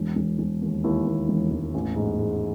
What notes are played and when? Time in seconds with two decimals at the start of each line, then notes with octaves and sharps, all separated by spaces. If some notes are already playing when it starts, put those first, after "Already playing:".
Already playing: E1
0.16 E1
0.39 E1
0.62 D#2
0.84 D#2 E4
1.07 D#2
1.29 E1
1.51 E1
1.74 A1
1.96 G#2
2.19 G#2